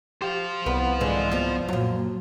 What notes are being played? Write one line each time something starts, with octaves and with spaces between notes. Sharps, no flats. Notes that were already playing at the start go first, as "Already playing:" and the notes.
G4 C5 F5
C2 B3 B4
G#2 D3 E3 G#3
F3 G3 B3
F#2 A#2 F#3